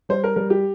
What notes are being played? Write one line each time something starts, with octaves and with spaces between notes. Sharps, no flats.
G3 C5
A#4
G3 A#4
G4